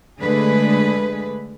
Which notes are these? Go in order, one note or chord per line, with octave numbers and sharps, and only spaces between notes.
D3 G#3 A3 G#4 B4